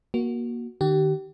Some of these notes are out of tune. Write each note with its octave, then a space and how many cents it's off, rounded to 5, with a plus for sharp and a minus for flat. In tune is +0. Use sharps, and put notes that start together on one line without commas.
A#3 +25 F#4 +0
D#3 -35 G4 -30